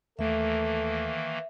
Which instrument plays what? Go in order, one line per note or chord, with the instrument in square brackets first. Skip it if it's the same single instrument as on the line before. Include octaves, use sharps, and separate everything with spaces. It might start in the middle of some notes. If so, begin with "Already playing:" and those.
[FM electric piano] D#2 A3 [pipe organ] D#3 E3 A#3 [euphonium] A4 [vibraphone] E5